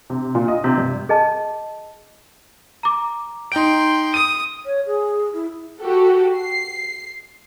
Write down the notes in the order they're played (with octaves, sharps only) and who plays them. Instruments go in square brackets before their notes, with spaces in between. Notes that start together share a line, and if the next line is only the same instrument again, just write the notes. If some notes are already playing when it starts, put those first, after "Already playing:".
[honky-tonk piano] C3
A#2
D#5
C3
G2
[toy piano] G#4 D#5 A5
[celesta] A#5 D6
[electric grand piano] D#4 D7 [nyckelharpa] G5 C6
[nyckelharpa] D#6 [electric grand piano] D#7
[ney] C#5
G#4
E4
[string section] F#4 G4 A4
C7